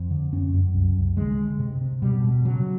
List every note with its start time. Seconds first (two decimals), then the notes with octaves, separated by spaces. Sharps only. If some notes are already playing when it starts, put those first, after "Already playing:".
Already playing: F2
0.11 D3
0.33 F#2 C#4
0.54 F#2
0.74 C2
0.96 C2
1.17 D3 G#3
1.39 D3
1.60 C3
1.81 C3
2.02 B2 G3
2.24 B2
2.45 C#3 F#3